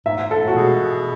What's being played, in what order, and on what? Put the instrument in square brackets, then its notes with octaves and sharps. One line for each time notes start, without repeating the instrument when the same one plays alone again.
[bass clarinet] G#2 [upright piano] E5
[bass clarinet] G#2
[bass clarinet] G#2 [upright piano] A4
[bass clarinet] A2
[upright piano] F#4
[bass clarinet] B2 [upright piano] G#4